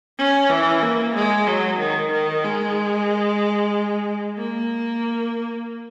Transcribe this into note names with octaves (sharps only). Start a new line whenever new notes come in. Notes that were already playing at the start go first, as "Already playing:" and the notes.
C#4
E3
A#3
G#3
F#3
D#3
D#3
G#3
A#3